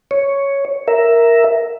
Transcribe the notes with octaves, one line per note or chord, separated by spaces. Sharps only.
C#5
A#4 E5